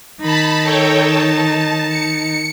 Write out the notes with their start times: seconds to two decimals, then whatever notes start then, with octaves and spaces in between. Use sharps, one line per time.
0.21 D#3 D#4 A5 B5
0.63 A4 C#5 G5
1.03 A5
1.88 C#7